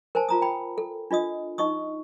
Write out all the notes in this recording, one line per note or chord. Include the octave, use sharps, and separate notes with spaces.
A#4 C5 G#5 A5
F4 A#5 D#6
G5 B5
A4
D4 F4 D#5 D#6
D#4 D#5 C#6 D#6